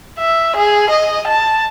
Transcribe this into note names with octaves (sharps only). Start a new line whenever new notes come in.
E5
G#4
D#5
A5